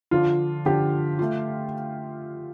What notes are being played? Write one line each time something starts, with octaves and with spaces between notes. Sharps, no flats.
D3 F3 D4 F4
D3 F3 D4 G4
A3 F4